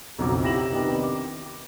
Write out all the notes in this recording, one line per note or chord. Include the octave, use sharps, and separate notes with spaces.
B1 F2 C#3 F#4 A#5 D6
E4 G4 A#6 E7 F#7
C3 D#3 B3 D4 G4 A#4
D6